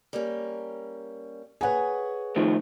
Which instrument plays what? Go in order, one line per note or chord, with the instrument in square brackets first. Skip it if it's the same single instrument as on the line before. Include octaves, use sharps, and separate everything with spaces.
[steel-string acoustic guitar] G3 A#3 C#4
[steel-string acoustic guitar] G#4 C#5 [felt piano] B4 F#5 G#5
[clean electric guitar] A2 D#3 F3